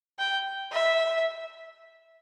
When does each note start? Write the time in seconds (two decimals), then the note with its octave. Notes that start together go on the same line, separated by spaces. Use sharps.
0.19 G5
0.72 E5